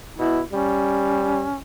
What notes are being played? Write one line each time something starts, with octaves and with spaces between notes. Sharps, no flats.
B2 E4
G3 C#4